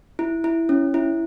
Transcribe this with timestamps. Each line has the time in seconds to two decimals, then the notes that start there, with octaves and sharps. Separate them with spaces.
0.19 E4
0.44 E4
0.69 C#4
0.94 E4